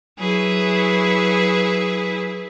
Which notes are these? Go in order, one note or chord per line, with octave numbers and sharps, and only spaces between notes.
F#3 E4 G#4 B4